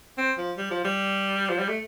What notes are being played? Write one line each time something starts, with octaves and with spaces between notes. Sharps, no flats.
C4
F3
G3
F3
G3
F3
G3
A3